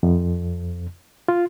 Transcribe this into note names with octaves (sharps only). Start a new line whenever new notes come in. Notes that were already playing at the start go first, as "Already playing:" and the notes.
F2
F4